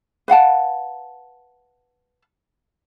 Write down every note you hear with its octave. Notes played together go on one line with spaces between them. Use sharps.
B4 F5 F#5 A5